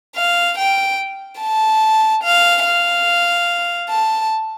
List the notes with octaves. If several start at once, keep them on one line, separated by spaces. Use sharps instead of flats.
F5
G5
A5
F5
F5
A5